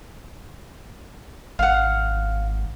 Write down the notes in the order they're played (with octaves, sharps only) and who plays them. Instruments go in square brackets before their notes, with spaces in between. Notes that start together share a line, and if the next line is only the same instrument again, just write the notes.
[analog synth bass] G#1 [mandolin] F5 F#5